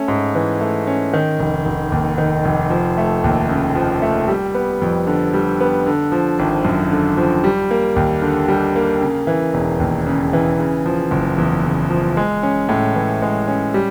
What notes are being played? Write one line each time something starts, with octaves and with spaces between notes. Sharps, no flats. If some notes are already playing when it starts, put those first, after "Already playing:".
Already playing: A3 C#4
G#2
E3
A3
C#4
D#3
F1
F1
D#2
D#3
F1
F3
A3
D#2
C#3
F3
A3
G3
B3
F2
D3
G3
B3
D3
F3
G#1
F#2
D3
F3
G3
A#3
D#2
D3
G3
A#3
C#3
E3
E1
D#2
C#3
E3
C#3
F3
F#1
E2
C#3
F3
G#3
C#4
A2
E3
G#3
C#4
G3